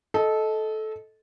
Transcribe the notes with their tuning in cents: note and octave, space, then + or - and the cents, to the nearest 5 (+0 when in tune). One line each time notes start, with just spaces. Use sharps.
A4 -15 D#5 +10